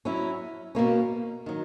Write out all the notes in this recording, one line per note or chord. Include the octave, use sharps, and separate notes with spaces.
F#3 C#4 E4
B2 A#3 C#4
D#3 F#3